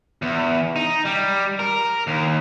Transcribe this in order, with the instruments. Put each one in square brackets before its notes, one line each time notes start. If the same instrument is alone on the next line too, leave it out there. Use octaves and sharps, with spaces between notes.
[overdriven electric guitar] E2
D#4
G3
A#4
D#2